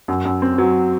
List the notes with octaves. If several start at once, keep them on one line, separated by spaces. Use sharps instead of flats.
F#2
F#2
C4
F#3